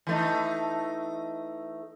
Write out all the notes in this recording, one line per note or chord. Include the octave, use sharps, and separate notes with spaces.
E3 A3 D#4